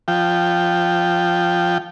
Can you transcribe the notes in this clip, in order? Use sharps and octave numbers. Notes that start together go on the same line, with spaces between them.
F3 G5